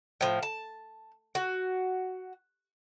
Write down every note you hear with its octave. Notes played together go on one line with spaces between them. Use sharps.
A2 F3
A5
F#4